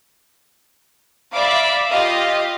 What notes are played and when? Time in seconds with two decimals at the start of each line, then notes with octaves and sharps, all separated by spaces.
1.33 D5 E5 F5 B5 D6
1.89 F4 G4 D#5 F5